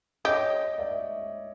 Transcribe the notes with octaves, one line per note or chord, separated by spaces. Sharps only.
G4 C#5 D#5
D5 E5